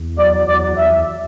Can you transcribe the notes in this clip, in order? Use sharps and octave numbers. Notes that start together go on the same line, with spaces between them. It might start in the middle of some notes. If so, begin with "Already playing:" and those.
Already playing: E2
F#3 D5
E2 D5
E2 E5